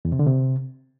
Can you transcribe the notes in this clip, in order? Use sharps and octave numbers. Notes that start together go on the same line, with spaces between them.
E2
C3
D3
C3